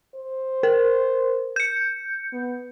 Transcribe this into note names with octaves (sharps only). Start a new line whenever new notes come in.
C5
A#4
G6 C#7
B3